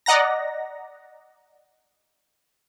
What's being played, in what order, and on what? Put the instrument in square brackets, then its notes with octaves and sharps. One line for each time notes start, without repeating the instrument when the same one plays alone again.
[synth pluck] D5 D#5 F#5 A#5 A#6